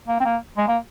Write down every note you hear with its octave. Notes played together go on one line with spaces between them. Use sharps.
A#3
C4
A#3
G#3
A#3